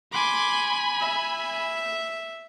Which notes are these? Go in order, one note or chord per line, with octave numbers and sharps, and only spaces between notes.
G#5 B5 C6 D6
E5